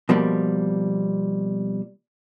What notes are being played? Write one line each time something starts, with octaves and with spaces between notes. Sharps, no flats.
B2 F3 G3 A#3